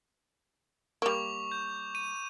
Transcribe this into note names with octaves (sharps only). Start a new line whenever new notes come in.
G3 A#3 C#6 D6 F7
G6
D#7